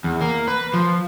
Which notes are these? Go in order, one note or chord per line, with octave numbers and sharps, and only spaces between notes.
E2
A#3
B4
F3